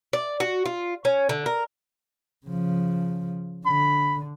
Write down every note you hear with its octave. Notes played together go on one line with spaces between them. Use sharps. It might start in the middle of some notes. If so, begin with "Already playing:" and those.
D5
F#4
F4
C#4
D3
A#4
C#3 F3
D3 B5